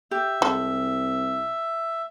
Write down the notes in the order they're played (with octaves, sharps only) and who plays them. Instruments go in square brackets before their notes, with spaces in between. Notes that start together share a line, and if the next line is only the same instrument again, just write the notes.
[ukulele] G4 [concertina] E5
[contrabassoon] C2 [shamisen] G#3 A4